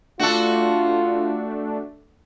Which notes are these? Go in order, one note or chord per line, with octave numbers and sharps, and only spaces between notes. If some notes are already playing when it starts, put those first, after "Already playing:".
A3 D4 F4 F#4 A4